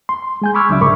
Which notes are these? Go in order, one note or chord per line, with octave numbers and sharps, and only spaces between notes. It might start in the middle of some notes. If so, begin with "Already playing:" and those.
C6
G#3 G#5 G6
B5 C#6 D6 E6 F6 G#6
C2 C#3 F#3 D4 E5 D6
G#2 A#4 B5 C#6